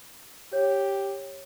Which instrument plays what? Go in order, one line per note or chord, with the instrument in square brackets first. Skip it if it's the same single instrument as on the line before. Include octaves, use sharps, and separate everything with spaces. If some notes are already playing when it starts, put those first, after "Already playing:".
[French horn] G4 [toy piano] C#5